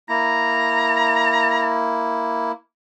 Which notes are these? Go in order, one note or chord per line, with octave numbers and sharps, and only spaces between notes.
A#3 E4 A#5